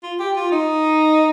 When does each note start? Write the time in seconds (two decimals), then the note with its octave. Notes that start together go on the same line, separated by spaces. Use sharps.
0.03 F4
0.19 G4
0.36 F4
0.51 D#4